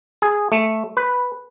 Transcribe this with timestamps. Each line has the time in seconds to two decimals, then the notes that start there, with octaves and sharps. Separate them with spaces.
0.22 G#4
0.52 A3
0.97 B4